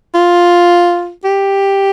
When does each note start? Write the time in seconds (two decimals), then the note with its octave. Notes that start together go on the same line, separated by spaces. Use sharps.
0.15 F4
1.24 G4